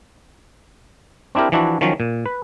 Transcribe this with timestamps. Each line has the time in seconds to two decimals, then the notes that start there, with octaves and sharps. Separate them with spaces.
1.35 C4 D4 E4 G4 A#4
1.52 E3 F3 D4 E4 F#4
1.81 D#3 F3 F#3 C#4
2.00 A#2
2.26 B4